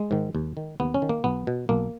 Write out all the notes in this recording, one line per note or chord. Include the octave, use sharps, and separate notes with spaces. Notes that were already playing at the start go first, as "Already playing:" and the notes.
Already playing: G#3
G#2 D#3
D#2
D#3
D#2 B3
C#4
D#3
A#3
B1 B3
B2
B1 A#3